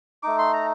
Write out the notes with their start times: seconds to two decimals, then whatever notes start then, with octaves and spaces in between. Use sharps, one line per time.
0.23 A3 D#4 D6
0.38 C6
0.53 A#5